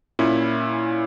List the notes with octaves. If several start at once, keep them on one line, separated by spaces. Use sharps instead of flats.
A#2 C#4 E4